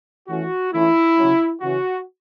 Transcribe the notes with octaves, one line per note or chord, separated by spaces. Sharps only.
E3 A3 C#4 F#4
E3 A3 C#4 E4
C#3 F#3 C#4
C#3 E3 C#4 F#4